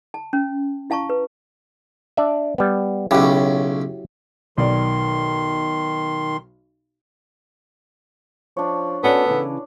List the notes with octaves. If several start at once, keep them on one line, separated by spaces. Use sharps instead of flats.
A5
C#4
E4 F5 A5 A#5 C#6
B4
D4 D5 E5
G3 B3
B1 C#3 F#3 E4 G4
B1 D#3 D5 C6
F3 D4 C#5
B3 C#4 F#4 A4 D5
C#3 E3 C#4